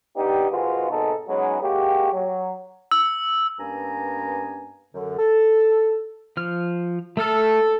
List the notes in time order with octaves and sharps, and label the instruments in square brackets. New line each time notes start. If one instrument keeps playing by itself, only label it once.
[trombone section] B3 D4 D#4 G4
G#2 D#3 G#3 F4 F#4 B4
G#1 B2 G#3 D#4 A4
F#3 G#3 B3 C#4 D#4
G#3 A#3 F#4 G4
F#3
[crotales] E6
[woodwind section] G2 A#3 B3 C#4 G#5 A#5
F#2 D3
A4
[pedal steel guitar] F3 F6
[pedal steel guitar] A3 E6 F6 [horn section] A4